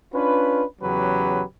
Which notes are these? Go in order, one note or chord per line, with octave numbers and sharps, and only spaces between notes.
C#4 D4 F4 B4
E2 C#3 F#3 C#4 G4 B4